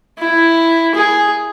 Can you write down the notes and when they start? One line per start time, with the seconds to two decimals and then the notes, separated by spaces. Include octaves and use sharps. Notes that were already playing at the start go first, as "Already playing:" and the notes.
0.19 E4
0.94 G#4